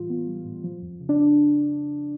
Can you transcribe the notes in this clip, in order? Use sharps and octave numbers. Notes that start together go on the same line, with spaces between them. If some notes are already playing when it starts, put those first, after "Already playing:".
Already playing: A2 E3 G3 F4
B3
G3
A2
F3
F2
C#3
D4